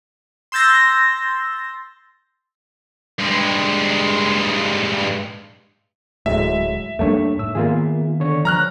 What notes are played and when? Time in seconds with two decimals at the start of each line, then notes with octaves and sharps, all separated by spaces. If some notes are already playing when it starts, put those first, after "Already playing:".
0.52 C6 E6 G6 A6 A#6
3.19 G2 G#3
6.26 D1 A2 F#3 G#3 E5
6.99 F2 G3 A3 A#3 D4 C#5
7.39 G#2 E6
7.55 D#3 A#3 B3 F4 G#4
8.20 D3 C#5 C#6
8.45 F3 A#5 F6 F#6